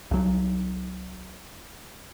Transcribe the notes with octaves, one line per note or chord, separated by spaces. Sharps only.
C2 F#3